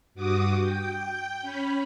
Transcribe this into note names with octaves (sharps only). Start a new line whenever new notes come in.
G2 F#4 D6 D#6
G5 G6
C#4 B5